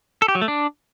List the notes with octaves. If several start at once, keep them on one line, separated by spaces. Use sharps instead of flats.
A4
G4
F#3
A3
D4